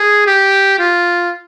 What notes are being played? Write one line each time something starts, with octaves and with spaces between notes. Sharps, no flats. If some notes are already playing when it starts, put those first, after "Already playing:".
Already playing: G#4
G4
F4